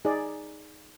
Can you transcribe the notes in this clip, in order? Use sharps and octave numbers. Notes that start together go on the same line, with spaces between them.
D#4 G#4 D5